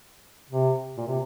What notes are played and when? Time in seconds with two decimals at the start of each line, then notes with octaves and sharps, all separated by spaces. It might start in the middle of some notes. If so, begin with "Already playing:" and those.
0.50 C3
0.97 A#2
1.07 C3